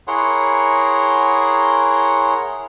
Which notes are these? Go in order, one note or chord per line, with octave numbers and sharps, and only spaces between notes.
E4 G#4 A#4 C#5 F#5 C6